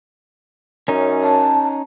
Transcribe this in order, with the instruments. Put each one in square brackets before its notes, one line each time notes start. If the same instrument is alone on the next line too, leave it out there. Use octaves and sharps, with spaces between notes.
[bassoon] F#2 [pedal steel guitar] C#4 D#4
[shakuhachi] A5